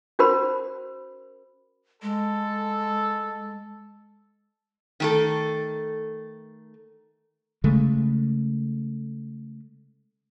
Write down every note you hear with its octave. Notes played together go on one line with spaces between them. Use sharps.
C#4 F#4 A#4 C5 B5
G#3 A4
D#3 A3 A4
C#3 G#3 A3